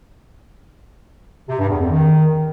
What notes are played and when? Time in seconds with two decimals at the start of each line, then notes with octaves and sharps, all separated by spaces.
1.49 C3
1.59 G2
1.70 E2
1.80 F2
1.91 D#3